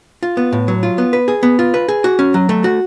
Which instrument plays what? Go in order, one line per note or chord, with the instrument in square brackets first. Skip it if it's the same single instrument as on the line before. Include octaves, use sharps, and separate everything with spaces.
[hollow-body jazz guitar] F4
B3
A2
F#3
F4
B3
B4
G#4
B3
F4
B4
G#4
F#4
C#4
F#3
A3
F#4